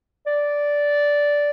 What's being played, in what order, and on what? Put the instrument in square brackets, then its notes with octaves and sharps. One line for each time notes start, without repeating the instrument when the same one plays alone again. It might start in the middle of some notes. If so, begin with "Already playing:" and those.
[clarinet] D5